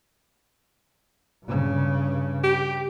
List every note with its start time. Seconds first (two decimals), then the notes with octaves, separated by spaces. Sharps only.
1.45 G2 C#3
2.44 G4